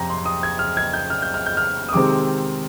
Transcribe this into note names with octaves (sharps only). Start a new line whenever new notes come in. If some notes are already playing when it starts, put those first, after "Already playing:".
Already playing: F2 C3 C4 G5 A#5
C6
D#6
G#6
F6
G#6
G6
F6
G6
F6
G6
F6
D#6
C3 D#3 G#3 C4 D6